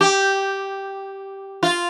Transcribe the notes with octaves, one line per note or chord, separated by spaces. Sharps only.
G4
F4